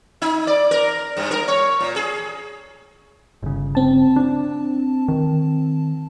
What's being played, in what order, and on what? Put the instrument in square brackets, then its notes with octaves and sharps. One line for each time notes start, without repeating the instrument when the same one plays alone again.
[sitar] D#4
D5
A#4
G2
A#4
C#5
A#2
G#4
[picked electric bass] G1 C#3
[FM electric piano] C4 A5
[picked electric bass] D4
D#3